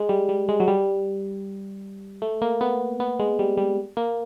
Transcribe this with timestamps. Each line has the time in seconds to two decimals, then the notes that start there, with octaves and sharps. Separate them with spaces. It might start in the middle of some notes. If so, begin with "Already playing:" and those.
Already playing: G#3
0.09 G3
0.29 G3
0.49 G#3
0.60 F#3
0.68 G3
2.22 A3
2.42 A#3
2.61 B3
3.00 B3
3.19 G#3
3.39 G3
3.57 G3
3.97 A#3